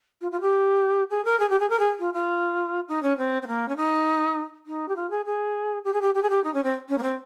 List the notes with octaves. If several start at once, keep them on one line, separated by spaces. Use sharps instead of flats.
F4
F4
G4
G#4
A#4
G#4
G4
G#4
A#4
G#4
F4
F4
D#4
C#4
C4
C4
A#3
C#4
D#4
D#4
G4
F4
G#4
G#4
G4
G#4
G4
G4
G#4
G4
D#4
C#4
C4
C#4
A#3
C4